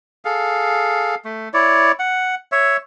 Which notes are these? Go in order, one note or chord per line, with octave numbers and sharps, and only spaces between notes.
G#4 A4 F5
A3
E4 C#5 D5
F#5
C#5 E5